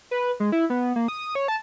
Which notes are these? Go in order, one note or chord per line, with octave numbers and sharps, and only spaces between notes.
B4
G#3
E4
B3
A#3
D#6
C#5
A5